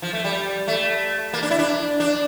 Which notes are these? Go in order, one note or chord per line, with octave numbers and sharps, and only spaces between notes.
F3
A3
G3
A3
A#3
D4
E4
D4
D4